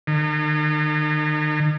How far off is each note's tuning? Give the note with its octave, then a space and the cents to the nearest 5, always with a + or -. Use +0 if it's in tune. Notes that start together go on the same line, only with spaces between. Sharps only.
D#3 -40